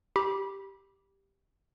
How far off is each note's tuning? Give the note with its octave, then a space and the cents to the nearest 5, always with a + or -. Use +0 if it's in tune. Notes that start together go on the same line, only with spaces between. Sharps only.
G4 +0 B5 -30